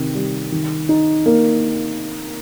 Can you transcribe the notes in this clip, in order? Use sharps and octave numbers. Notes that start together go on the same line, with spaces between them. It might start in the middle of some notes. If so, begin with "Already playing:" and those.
Already playing: C3 D#3
G3
D#3
D#4
A#3